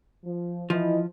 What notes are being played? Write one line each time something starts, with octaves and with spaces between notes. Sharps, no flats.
F3
E3 F3 E4 D#5